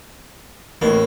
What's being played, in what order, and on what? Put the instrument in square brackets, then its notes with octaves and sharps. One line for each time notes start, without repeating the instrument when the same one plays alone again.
[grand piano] A1 A2 [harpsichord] A#3